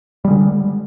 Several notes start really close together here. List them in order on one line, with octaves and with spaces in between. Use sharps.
G3 G#3 D3